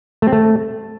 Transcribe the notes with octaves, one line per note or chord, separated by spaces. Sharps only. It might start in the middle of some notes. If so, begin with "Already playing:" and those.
A3
C4
A3